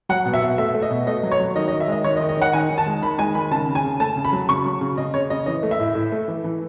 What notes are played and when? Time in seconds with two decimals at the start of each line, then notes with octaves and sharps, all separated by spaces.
0.09 F#3 F#5
0.25 B2
0.34 E5
0.42 B2
0.58 A3 E5
0.74 A3
0.82 D#5
0.91 B2
1.07 A3 D#5
1.23 F#3
1.32 C#5
1.40 F#3
1.56 D#3 D#5
1.68 D#5
1.72 D#3
1.80 E5
1.88 G#3 D#5
2.04 D#3 C#5
2.17 D#5
2.21 D#3
2.29 D#5
2.37 D#3 F#5
2.53 D#3 G#5
2.70 D#3
2.78 A5
2.86 G#3
3.02 D#3 B5
3.18 G#3 G#5
3.35 D#3 B5
3.51 C#3 A5
3.68 C#3
3.75 G#5
3.84 C#3
4.00 A3 A5
4.16 C#3
4.25 B5
4.33 F#3
4.49 C#3 C#6
4.66 F#3
4.81 C#3
4.98 C#3 D#5
5.14 C#3 C#5
5.30 C#3 D#5
5.46 E3 D#5
5.63 A3
5.71 E5
5.80 A2
5.95 A2
6.12 A3
6.28 E3
6.44 E3